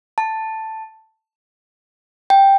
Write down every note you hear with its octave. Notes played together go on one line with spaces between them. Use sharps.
A5
G5